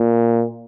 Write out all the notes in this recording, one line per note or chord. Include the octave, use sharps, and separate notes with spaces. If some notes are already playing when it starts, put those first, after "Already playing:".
Already playing: A#2